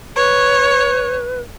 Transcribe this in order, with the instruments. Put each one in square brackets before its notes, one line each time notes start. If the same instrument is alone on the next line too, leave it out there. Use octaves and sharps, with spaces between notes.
[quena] B4 [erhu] C#5